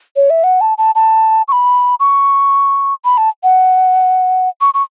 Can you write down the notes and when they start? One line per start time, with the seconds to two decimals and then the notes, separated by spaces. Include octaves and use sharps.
0.16 C#5
0.30 E5
0.44 F#5
0.61 A5
0.78 A5
0.95 A5
1.48 C#6
1.52 B5
2.00 C#6
3.05 B5
3.17 A5
3.43 F#5
4.61 C#6
4.74 C#6